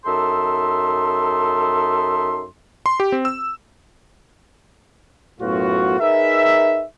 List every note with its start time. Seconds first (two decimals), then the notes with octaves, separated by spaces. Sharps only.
0.06 F#2 D#4 A4 E5 C6
2.86 C6
3.00 G4
3.12 C4
3.25 E6
5.41 B1 F#2 A2 B3 F4 F#4
6.00 D#4 G#4 A#4 B4 E5